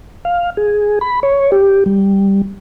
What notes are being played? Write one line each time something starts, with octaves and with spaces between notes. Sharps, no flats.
F5
G#4
B5
C#5
G4
G3